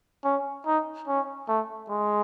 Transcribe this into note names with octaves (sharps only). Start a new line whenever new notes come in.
C#4
D#4
C#4
A3
G#3